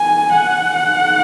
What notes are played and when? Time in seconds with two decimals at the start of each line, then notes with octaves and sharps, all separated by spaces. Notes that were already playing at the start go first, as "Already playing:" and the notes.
Already playing: G#5
0.33 F#5